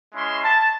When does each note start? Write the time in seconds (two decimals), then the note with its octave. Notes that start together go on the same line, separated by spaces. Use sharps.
0.14 G#3 C#4 E4 C6
0.43 A5